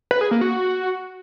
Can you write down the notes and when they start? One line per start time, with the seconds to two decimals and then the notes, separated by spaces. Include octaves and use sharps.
0.11 B4
0.21 G#4
0.31 A#3
0.41 F#4